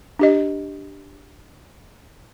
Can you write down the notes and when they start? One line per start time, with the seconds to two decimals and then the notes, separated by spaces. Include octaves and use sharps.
0.19 D4 G4 D#5